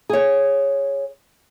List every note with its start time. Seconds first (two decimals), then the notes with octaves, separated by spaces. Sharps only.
0.09 G#4 C#5